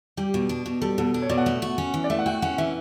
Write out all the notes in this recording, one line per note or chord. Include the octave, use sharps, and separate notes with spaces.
G3 G4
B2
D4
B2
G3 A4
B2 A4
D4
C#5
B2 D5
F#5
A3
F#4
C#4
E3
D5
A3 E5
F#5
F#4 G5
C#4 F#5
E3 E5